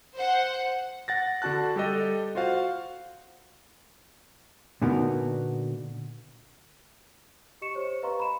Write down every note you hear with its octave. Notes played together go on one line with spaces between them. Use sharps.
C5 F#5
F#5 A6 A#6
D3 D4 F#4 A5 F#6
G3 G4 A4 D#5
F4 F#4 C5 F5 F#5
A#2 D3 B3 D#4 F#4 A#4
G4 D#5 C#6 C#7 E7
G4 C5 C#5
B4 D#5 F5 A#5 C6 C#6
B5 C6 E7